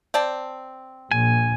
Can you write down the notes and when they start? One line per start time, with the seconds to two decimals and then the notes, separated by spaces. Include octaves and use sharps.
0.14 C4 D5 A5
1.12 A#1 G#5